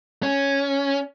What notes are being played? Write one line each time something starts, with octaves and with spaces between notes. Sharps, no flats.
C#4